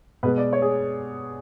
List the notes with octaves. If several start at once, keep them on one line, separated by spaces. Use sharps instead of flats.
B2 G#3 B3 B4
D5
C#5
G#4